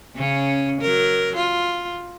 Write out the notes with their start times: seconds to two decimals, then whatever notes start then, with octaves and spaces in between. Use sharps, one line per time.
0.16 C#3 C#4
0.81 F#3 A#4
1.36 F4